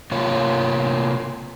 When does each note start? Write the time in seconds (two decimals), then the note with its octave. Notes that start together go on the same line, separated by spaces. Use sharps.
0.12 C3 A#3 F4 C#5